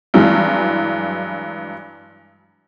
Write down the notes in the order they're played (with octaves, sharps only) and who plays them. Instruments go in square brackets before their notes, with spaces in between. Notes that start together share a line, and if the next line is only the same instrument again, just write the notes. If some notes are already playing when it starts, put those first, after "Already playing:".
[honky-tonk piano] G2 E3 F#3 G#3